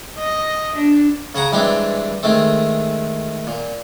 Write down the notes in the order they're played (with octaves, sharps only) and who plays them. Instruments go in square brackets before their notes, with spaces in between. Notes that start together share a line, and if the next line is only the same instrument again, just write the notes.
[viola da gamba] D#5
D4
[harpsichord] C#3 G#4 F#5 A#5
G2 E3 G3 G#3 C4 D4
D#3 G#3 A3 C4
A#2